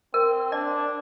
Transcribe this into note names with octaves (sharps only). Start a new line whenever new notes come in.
C4 A#4
D4 D5